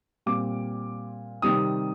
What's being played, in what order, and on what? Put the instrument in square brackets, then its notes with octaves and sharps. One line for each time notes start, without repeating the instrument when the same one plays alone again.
[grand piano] A#2 G3 C4 D6
C3 D#3 G3 C4 D#6